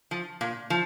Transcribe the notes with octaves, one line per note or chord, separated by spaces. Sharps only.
F3
A#2
F3